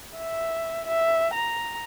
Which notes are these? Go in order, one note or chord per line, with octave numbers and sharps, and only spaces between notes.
E5
E5
A#5